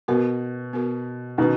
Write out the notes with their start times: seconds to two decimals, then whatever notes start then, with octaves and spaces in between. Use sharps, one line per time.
0.08 B2 B3 F#4 A#4
0.73 B3 F#4 A#4
1.38 B2 D#3 C#4 E4 B4